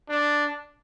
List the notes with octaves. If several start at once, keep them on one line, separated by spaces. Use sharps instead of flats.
D4